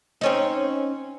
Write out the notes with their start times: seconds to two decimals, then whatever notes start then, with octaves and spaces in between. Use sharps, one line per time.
0.21 C4 C#4 D#4